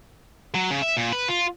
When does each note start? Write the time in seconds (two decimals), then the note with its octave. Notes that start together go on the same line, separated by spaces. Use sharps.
0.54 F#3
0.71 C#3
0.82 E5
0.97 A#2
1.13 B4
1.29 F4